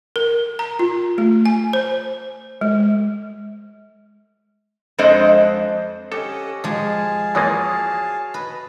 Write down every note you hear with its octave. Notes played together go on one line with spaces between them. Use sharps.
A#4
A#5
F4
A3
G#5
C5
G#3
F2 G#3 D4 C5 D#5
C#4 G4 A4 D#5 F#5
F3 G#3 G#4 F5 A5
E3 F3 A#3 F#4 C#5 D#6 A6
B4 D#5